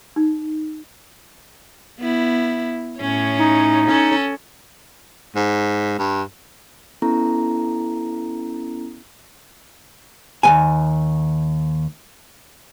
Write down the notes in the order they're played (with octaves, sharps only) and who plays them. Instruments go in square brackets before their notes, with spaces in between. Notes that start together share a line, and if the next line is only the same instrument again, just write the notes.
[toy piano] D#4
[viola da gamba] B3 E4
A2 C#4 C#5
[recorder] D#4
[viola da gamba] C#4 A4 C#5
[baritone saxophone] G#2
G2
[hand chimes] B3 C#4 E4 A4 A#5
[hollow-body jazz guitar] D#2 F#3 G#5